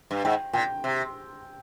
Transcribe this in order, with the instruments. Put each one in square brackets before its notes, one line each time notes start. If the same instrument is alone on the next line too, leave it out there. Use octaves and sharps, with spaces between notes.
[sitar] G2
[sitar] G#2 [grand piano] G5
[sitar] A#2 [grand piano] G5
[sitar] C3